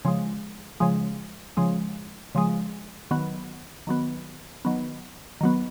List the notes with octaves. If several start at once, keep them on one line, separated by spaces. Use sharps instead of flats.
C#3 F3 G#3
C#3 F3 G#3
C#3 F3 G#3
C#3 F3 G#3
D#3 F#3 B3
D#3 F#3 B3
D#3 F#3 B3
D#3 F#3 B3